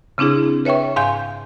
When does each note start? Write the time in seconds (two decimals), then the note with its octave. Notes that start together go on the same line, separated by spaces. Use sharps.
0.18 C#3 C4 D4 E4 G#4
0.65 B4 C#5 E5 G5 C#6
0.96 G#2 F5 G#5 C6 G6